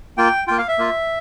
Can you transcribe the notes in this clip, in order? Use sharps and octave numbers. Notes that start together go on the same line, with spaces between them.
A#3 F4 G5
A#3 F4 G5
F5
E5
A#3 F4